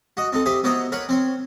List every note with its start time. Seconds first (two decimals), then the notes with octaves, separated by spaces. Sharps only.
0.17 F#4 D#5
0.32 C4 D#4 A4
0.46 G4 C5 D#5 E5
0.64 B3 E4 F#4 C5 D#5 A#5
0.92 A#4 B4 C#5 F#5 B5
1.09 C4 C5 C#5